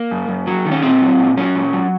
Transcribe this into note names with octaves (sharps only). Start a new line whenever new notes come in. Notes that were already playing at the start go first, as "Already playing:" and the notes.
Already playing: A#3
F#2
F#2
F#3
D#3
C#4
A#2 C4
F#3
A#2
F#3 C#4
A#2
F#3